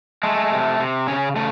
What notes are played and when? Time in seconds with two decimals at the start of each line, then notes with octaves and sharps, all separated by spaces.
0.23 G#3 A3
0.52 C3
0.80 C3
1.07 C#3 C#4
1.36 C#3 A3